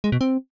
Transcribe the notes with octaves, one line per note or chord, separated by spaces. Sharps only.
G#3
B2
C4